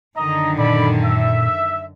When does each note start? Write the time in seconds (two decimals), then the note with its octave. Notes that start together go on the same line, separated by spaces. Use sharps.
0.17 F#2 D3 D#3 D#5 A#5
0.58 A#2 A4 D5 B5
1.04 E5